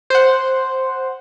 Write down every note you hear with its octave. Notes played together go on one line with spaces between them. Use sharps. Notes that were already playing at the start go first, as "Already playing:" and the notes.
C5 F#5